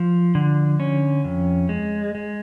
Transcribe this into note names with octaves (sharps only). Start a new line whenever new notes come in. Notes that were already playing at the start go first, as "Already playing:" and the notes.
Already playing: F3
D3
C#4
F2
G#3
G#3